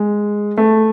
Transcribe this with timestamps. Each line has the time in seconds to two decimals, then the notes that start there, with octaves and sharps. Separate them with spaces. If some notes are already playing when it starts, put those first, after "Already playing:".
Already playing: G#3
0.58 A3